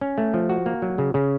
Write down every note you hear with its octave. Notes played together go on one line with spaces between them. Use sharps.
C#4
A3
F3
F#4
A#3
F#3
C#3
C#3